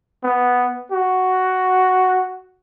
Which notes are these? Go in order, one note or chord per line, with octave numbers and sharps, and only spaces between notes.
B3
F#4